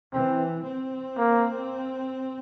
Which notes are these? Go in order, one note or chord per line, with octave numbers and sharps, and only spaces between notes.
E3 C4
C4
A#3